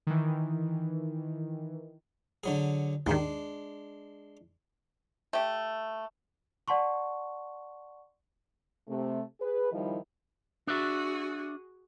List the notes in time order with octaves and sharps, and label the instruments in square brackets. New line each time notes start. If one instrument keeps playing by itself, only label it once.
[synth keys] D#3 E3
[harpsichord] D3 F#3 G#4
[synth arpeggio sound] D#2 G#2 D#3 [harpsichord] G#3 D4
[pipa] A3 G4
[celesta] D5 F#5 A5 C6 C#6
[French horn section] C3 A3
G#4 B4
D#3 F3 G3 D#4 E4
[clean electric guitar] D4 E5 [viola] F#4 G#4